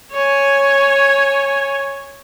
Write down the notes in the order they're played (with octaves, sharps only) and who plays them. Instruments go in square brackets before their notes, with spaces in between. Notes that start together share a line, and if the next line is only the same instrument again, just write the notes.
[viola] C#5 G#5